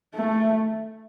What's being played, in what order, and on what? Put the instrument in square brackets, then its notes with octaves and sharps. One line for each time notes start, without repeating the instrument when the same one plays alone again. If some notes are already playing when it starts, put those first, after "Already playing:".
[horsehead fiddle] A3